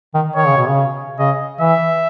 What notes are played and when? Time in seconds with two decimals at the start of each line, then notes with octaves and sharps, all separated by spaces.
0.14 D#3
0.35 D#3 C#5
0.46 C#3
0.57 B2
0.68 C#3
1.18 C#3 D#5
1.61 E3 E5